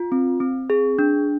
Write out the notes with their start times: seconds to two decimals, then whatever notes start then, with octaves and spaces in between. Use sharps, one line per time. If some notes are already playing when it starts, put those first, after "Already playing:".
Already playing: F4
0.12 C4
0.40 C4
0.70 G#4
0.99 D4